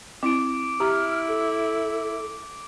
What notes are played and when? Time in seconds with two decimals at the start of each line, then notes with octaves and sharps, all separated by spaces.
0.23 C4 E4 D6 D7
0.80 E4 G4 A#5 F6
1.28 A4